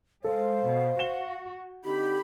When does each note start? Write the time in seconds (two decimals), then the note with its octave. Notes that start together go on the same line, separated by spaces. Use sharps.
0.24 G#3 A4 C5 F5
0.64 B2
0.99 F#4 E7 G7
1.85 D3 C4 D#4 G4 B5